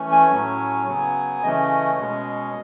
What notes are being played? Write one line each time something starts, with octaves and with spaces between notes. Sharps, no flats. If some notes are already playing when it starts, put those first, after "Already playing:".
Already playing: E3 A3 C#4
G#5
A2 F#3 C#4
C#3 F#3 B3
C#3 E3 A3 C#4 D#5
B2 G#3 C#4